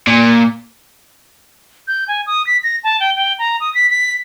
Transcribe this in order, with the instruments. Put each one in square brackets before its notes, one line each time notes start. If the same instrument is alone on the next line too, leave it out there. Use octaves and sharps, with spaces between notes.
[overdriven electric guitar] A#2
[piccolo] G6
G#5
D#6
B6
A#6
A5
G5
G5
A#5
D#6
B6
B6